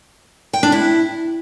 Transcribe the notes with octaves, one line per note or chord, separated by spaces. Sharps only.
G5
D4
E4